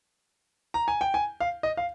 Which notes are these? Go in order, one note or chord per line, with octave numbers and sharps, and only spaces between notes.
A#5
G#5
G5
G#5
F5
D#5
F5